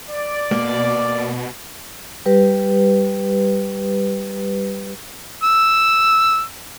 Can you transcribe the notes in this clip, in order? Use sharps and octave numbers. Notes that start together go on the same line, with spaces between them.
D5
B2 A#3
G3 G4 B4
E6